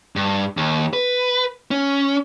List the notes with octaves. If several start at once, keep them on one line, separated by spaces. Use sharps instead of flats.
G2
D#2
B4
C#4